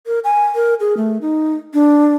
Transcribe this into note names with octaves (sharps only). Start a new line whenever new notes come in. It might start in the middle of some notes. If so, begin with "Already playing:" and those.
A#4
G#5
A#4
G#4
A3
D#4
D4